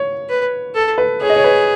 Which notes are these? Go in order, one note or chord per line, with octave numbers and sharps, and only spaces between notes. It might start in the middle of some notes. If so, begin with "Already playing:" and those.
Already playing: C#5
B4
A4
B4
G#4 C#5
D#5
C#5
B4